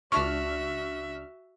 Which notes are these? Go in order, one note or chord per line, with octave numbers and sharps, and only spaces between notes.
C#2 D4 F#4 E5 C#6 F6